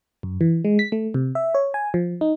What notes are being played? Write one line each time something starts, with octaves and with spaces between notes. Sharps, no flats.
F#2
E3
G#3
B6
A3
C3
E5
C#5
G#5
F3
D#4